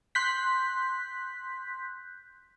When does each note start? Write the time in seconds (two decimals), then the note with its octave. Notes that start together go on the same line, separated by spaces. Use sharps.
0.15 C6 F#6 G6 B6